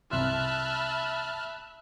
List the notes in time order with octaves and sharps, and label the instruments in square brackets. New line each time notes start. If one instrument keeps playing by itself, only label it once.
[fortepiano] C2 C6 [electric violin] E5 B5 [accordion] A5 F6 F#6